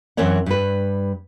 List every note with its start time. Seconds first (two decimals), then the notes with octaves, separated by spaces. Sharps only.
0.17 F#2 E3 C4 A#4 C#5 F#5
0.46 G2 B4